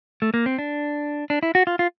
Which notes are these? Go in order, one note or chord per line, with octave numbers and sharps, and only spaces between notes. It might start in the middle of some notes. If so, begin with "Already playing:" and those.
A3
A#3
C4
D4
D4
E4
F#4
F4
F4